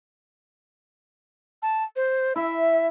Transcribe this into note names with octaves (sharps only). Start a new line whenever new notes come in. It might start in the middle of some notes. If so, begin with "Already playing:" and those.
A5
C5
E4 E5